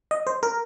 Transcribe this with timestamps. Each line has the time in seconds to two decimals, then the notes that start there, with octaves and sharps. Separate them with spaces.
0.11 D#5
0.27 C5
0.43 A#4